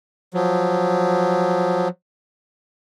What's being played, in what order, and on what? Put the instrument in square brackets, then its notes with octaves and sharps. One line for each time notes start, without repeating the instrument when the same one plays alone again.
[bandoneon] F3 F#3